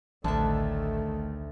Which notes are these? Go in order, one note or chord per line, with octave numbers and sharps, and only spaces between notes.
A1 D2 D#3 A3 E5 A5 F#6